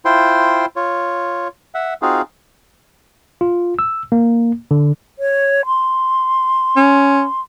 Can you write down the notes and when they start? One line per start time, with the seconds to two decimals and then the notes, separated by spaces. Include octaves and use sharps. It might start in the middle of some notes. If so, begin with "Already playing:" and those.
0.05 E4 F4 C5 G5 C6
0.76 F4 C#5
1.74 E5 F#5
2.02 C4 D#4 F4 F#4 G#4 F5
3.41 F4
3.79 E6
4.12 A#3
4.71 D3
5.19 C#5
5.66 C6
6.77 C#4